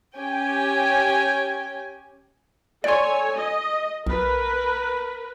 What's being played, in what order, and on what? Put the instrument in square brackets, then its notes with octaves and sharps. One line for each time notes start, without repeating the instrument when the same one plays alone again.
[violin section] C#4 G4 G5 G#5
[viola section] A4 C#5 G#5 [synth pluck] D5 C6
[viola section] D#5
[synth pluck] B1 [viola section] A#4 B4